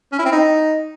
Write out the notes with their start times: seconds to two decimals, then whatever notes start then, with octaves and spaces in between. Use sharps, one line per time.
0.12 C#4
0.19 E4
0.25 C4
0.32 D#4